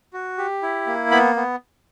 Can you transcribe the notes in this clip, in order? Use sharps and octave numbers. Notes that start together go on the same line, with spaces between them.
F#4
G4
E4
A#3
B3 B5
B3